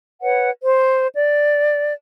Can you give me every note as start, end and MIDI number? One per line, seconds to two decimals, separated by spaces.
0.23 0.49 71
0.23 0.49 73
0.23 0.49 78
0.62 1.06 72
1.15 1.92 74